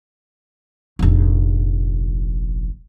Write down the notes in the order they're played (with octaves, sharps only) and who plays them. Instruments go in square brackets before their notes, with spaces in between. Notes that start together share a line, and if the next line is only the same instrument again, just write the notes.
[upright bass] F1 A#1